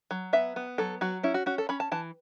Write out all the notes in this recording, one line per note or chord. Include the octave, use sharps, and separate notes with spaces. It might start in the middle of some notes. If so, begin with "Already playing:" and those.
F#3
B3 E5
B3
F#3 A4
F#3 F#4
C#4 E4
F#4
C#4 F#4
A4
C#4 B5
A5
E3 A5